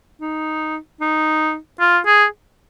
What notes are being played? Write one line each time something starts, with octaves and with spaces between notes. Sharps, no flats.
D#4
D#4
F4
G#4